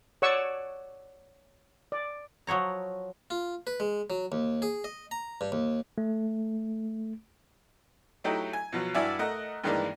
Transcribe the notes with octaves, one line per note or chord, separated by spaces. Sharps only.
C#5 D5 F#5 C#6 E6
D5
F3 F#3 C#5 A#5
F4
B4
G#3
F#3
D#2
G#4
D#5
A#5
G2
D#2
A3
F#3 A3 D#4 E4 G4
G#5
B2 F3 F#3
G2 E4 F#4 D5 E5 G#5
A3 A#4 D#5 F#5
G2 D#3 E3 G#3 A#3 D4